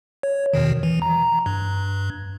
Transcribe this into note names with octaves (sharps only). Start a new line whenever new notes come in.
C#5
E2 B2 D#3
E3
A#5
G2